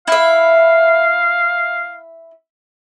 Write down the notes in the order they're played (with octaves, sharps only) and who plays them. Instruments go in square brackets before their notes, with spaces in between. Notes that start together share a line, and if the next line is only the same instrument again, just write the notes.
[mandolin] E4 E5 [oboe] F5